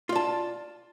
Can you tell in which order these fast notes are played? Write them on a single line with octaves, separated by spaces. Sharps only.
F4 D5 A5